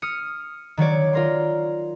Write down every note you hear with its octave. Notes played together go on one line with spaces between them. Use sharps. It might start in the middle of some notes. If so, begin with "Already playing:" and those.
D#6 F6 C#7
D#3 F#3 C#5 D5
F4 A#4 C6